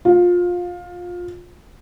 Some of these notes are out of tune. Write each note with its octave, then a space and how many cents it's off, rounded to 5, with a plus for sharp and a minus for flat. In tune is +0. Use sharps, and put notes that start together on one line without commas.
F4 +20